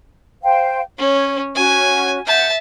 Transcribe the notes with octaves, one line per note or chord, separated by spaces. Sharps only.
C5 F5 G5
C#4 C#5
C#4 F#4 G#5
E5 F#5 A5 G6